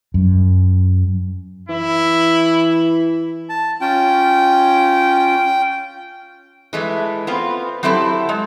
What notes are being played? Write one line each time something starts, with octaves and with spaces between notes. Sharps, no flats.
F#2
E3 E4
A5
C#4 F4 G5
E3 G#3 A3
B3 C4 F4
F#3 C4 E4 G4 A4
G#3